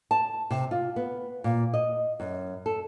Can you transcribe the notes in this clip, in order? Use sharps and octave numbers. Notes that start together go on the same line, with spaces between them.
A5
C3
F4
B3
A#2
D#5
F#2
A4